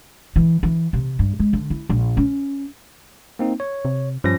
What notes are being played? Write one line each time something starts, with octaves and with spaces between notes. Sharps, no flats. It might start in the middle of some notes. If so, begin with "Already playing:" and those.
E3
E3
C3
G2
G#3
D3
E4
A#1
C#4
A#3 C4 D#4
C#5
C3
G2 F3 C#4 A#6